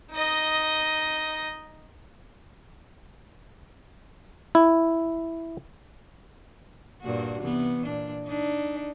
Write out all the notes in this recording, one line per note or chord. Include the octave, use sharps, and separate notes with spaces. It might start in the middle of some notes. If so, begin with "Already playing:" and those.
D#4 D#5
E4
G2 A#2 F#4
C3 E3 B3
A#2 D4
D4 D#4